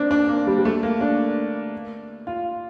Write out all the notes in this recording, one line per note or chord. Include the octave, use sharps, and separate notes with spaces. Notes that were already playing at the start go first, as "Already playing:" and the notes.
Already playing: A#3 C4 D4
D4
A#3
G3
G3
A3
A#3
D4
F4